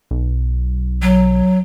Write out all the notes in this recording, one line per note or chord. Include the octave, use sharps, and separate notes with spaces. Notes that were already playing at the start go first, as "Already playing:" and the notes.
B1
F#3